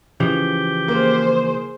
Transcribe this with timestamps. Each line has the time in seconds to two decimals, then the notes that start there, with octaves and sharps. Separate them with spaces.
0.20 C#3 E3 F3 G4
0.88 A#3 G#4 C5